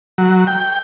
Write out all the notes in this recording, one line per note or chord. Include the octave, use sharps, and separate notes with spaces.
F#3
G5